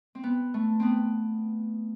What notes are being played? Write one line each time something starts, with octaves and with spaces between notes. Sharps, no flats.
C4
B3
A3
B3 C4